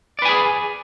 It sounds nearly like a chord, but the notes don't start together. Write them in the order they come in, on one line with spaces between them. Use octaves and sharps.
D5 B4 G#5 G#4